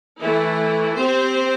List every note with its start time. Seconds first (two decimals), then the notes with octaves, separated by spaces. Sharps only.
0.21 E3 A3 E4
0.96 C4 G4 C5